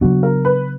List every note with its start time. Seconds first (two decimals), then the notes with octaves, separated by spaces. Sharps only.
0.01 C#3 F#3 B3 D4 F#4
0.23 A#4
0.45 B4